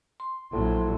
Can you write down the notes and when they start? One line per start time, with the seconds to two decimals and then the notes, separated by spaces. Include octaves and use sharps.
0.20 C6
0.53 A#1 A2 F#3